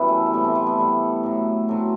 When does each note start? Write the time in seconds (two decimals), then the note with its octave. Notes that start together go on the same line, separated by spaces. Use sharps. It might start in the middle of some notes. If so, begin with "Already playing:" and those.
Already playing: F#2 E3 G3 B3 E4 B4
0.08 A3
0.26 A3
0.34 A2 G3 B3
0.44 A3 C4
0.55 A3
0.67 B3
0.79 A2 G3
1.23 A2 F#3
1.68 A2 F#3 A3 C4